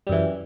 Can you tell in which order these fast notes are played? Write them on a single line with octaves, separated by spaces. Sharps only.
G3 F#2 E3